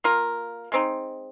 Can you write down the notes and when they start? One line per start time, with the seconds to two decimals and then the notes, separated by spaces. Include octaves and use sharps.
0.04 A#3 F4 A#4
0.72 G#3 C4 D#4